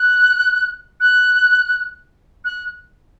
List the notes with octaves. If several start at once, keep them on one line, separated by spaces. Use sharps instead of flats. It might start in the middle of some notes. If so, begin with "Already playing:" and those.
Already playing: F#6
F#6
F#6